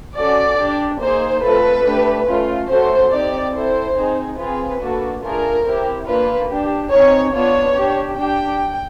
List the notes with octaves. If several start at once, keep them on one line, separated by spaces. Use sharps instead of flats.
C#4 F#4 A4 D5
D4 G4
A#3 D#4 G#4 C5
A3 C4 F4 A4 B4
A3 D4 G4
A3 C#4 F4
A3 C#4 F#4 A4 C5
C4 D#4 G4 D5
C4 E4 A4 C5
C4 D#4 G#4
C4 F4 G#4 B4
A#3 D4 F#4 A4
A3 D4 F4 G#4 A#4
C4 E4 G4
A#3 D4 F4 B4
D4 G4
C4 D#4 G#4 C#5
B3 D4 F4 C#5
D4 G4
D4 G4 G5